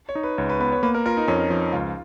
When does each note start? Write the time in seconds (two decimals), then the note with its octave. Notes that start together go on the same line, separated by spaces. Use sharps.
0.09 C#5
0.15 D#4
0.23 B4
0.38 C#2 C#5
0.49 B4
0.60 B3 B4
0.72 C#5
0.83 A#3 B4
0.94 A#4
1.06 F4 A#4
1.17 D#4
1.28 F2 C#4
1.50 F3 D#4
1.73 C#2 F4